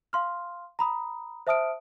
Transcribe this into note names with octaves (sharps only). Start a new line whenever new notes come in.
F5 C6 F6
A#5 B5 D#6
C5 E5 A5 D#6 F6 D7